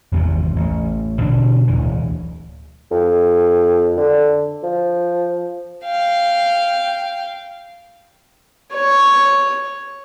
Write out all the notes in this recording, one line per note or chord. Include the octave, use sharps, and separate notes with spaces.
G#1 E2 G#2 C3
A1
B2 D3 E3 D4
D1 A#1 E3
F2
D3
F3
F5 G5
C#5